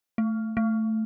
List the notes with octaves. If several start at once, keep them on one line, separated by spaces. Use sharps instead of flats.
A3
A3